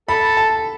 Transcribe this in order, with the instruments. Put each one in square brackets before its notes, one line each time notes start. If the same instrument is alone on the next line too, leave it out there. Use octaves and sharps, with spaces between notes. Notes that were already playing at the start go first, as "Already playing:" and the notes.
[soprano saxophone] A4 [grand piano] B5
[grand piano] A5